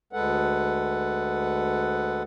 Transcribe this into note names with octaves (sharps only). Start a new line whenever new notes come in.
D2 G#3 A4 B4 F#5